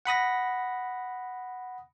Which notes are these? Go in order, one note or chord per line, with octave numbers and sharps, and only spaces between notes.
F#5 B5 D#6 A#6